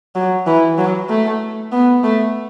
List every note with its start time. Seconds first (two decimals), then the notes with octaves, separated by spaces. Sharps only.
0.15 F#3
0.47 E3
0.78 F#3
1.09 A3
1.72 B3
2.04 A3